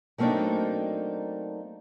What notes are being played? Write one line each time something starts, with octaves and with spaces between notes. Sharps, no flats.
F#3 A3 A#3 C4 D4 D#4